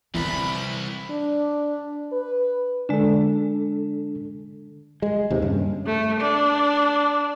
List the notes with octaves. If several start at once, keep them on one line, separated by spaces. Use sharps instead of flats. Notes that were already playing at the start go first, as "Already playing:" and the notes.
C2 D3 E3 C4 B5
D4
B4
D3 G#3 D4 A4
G#3
D#2 C3
G2 C#3
A3
D4